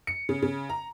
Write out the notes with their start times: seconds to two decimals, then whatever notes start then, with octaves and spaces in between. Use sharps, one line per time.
0.07 C#7
0.29 C#3
0.42 C#3
0.69 A#5